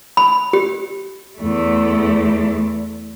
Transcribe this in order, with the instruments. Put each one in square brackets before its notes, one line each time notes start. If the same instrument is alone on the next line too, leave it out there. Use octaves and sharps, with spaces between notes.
[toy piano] B5
G4
[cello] E2 A3